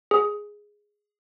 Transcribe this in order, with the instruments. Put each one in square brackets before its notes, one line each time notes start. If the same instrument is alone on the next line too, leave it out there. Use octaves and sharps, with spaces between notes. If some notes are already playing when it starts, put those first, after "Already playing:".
[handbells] G#4